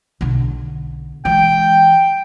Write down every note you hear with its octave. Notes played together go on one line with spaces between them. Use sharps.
B1 D3
E3 G#3 G5